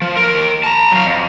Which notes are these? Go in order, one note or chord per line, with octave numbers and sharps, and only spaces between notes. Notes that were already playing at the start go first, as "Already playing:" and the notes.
F3
D#2 A#4
A5 A#5
F#3 F5
F2